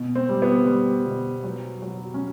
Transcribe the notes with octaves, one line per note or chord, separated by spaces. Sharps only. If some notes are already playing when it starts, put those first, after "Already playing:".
Already playing: B2
C4
G3
B3
G3
B2
F#3
F#3
C#4